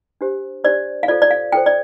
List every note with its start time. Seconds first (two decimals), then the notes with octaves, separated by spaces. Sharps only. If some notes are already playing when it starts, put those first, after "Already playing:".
0.21 D4 G4 C5
0.64 D4 G4 C5 D5
1.03 F5
1.08 F4 A4 C5 D5
1.22 D5
1.31 F5
1.52 F4 A4 C5 G5
1.66 D5